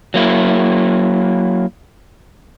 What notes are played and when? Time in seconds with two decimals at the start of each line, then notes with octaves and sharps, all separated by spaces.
0.14 F#3 A#3 E4